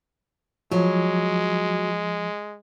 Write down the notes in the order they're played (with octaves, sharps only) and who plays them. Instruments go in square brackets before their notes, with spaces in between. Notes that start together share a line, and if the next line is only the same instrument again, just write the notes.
[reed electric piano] F3 [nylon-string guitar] F#3 [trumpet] G#3